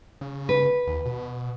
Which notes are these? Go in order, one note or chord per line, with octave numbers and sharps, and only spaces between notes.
C#3
B4
D#2
B2